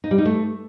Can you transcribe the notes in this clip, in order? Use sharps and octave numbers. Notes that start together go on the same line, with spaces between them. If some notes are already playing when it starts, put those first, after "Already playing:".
D#4
G3
D#4
A3